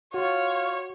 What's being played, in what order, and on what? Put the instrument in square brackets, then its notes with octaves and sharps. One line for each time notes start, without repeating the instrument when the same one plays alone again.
[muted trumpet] F4 [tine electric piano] F#4 [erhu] C#5